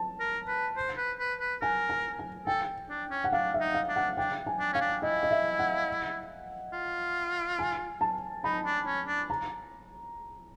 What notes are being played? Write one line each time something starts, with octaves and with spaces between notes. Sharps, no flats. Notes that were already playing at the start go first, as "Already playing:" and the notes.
Already playing: A5
A#4
B4
C5
B4
B4
B4
A#4 G#5
G#5
G#5
A4 G5
D4
C#4
F#5
D4 F5
E5
D#4
F5
D4
F#5
D4 G5
G#5
D4
C#4 F5
D4
E4 D#5
D#5
E5
F#5
F4
G#5
A5
D#4 B5
D4
C#4
D4
A#5